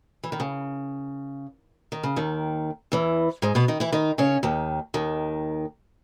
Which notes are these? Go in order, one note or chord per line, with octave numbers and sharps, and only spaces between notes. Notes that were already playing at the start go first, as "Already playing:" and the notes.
E3
D#3
C#3
D#3
C#3
D#2 D#3
E2 E3
G#2 G#3
B2 B3
D#3 D#4
E3 E4
D#3 D#4
C#3 C#4
D#2 D#3
D#2 D#3